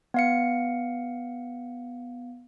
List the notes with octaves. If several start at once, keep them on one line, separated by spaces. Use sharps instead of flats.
B3 F5 C#7